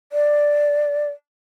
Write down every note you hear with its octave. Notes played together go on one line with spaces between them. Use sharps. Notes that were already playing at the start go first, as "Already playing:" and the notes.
D5